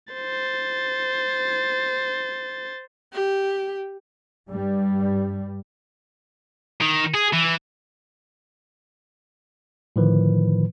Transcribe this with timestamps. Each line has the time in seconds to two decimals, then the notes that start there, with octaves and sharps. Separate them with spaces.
0.14 C5 A6
3.13 G4
4.49 G2 G3
6.81 D#3
7.14 G#4
7.33 E3
9.96 A2 D3 D#3 F3 B4